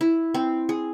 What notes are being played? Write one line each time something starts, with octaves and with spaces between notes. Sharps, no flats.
E4
C4
G#4